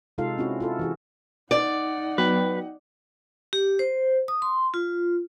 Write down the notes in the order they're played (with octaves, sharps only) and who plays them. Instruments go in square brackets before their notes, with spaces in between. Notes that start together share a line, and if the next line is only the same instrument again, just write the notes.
[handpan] C3 G#3 D#4 F4 A4 F5
C4 C#4 E4 F#4
E4 F4 A4
E3 F#4 G#4
[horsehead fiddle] D#4 F#5 [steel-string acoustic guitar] D5
[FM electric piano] F#3 B3 G5 [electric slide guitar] B4
[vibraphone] G4
C5
D#6
C6
F4